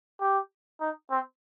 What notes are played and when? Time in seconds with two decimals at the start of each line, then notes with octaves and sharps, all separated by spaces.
0.21 G4
0.80 D#4
1.11 C4